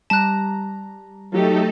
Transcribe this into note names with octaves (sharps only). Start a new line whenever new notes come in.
G3 A5 A#5 F#6
F#3 A3 D#4 G4 A4